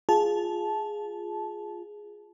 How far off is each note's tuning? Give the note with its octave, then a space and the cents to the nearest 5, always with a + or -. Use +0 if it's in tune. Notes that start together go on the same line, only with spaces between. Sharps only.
F4 +5 G#4 +0 A5 -15